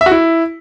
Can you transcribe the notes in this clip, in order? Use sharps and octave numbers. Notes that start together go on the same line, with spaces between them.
E5
F#4
E4